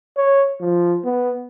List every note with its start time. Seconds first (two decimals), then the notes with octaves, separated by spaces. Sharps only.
0.17 C#5
0.61 F3
1.04 B3